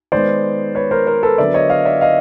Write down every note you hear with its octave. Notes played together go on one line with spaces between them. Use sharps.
D#3 G#3 B3 C5 D5
B4 C#5
A#4 C5
A#4 C5
A4 B4
D3 F#3 B3 D5 E5
C#5 D#5
D#5 F5
D5 E5
D#5 F5